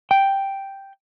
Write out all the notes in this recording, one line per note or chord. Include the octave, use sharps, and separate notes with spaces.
G5